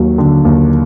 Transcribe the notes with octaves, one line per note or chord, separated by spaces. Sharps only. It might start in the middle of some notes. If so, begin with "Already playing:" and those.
Already playing: D#2 F#3
D3
D#2